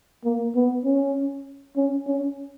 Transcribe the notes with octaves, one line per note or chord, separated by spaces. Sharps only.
A#3
B3
C#4
C#4
C#4